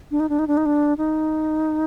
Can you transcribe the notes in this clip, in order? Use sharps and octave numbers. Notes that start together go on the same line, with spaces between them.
D4
D#4
D4
D#4
D4
D#4
D4
D#4